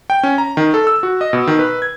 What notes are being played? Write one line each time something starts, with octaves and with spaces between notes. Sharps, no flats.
G5
C#4
A#5
D#3
A4
E6
F#4
D#5
B2
D#3
B4
G#6